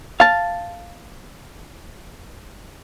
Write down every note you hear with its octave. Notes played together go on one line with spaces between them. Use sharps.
F5 A5